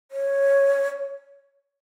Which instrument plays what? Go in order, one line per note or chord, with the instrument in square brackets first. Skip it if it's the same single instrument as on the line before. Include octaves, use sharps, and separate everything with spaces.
[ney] C#5